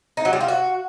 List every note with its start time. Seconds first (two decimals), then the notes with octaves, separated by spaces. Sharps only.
0.17 D#4
0.25 F#3
0.33 G3
0.41 F4
0.48 F#4